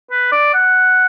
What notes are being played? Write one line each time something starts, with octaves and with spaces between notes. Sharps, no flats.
B4
D5
F#5